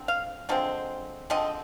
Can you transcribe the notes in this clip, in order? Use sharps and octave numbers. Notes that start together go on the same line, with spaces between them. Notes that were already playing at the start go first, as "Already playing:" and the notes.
Already playing: D3 F3 C4
F5
D3 F3 G#3 C4
D3 F3 G#3 C4 D#5